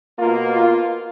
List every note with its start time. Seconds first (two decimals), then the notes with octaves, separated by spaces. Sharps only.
0.18 B2 A#3 F4
0.50 F4